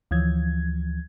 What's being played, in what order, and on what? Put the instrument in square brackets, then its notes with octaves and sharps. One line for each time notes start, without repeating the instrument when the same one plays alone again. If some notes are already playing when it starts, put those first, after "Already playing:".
[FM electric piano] D2 E3 F3 G#6